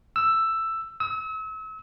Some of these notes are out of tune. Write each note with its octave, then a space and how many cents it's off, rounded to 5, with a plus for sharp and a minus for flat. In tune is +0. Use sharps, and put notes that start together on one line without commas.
E6 +10
E6 -35